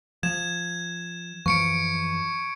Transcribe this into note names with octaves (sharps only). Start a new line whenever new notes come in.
F3 G#6 E7
F#2 E3 F3 C#6 C#7 D7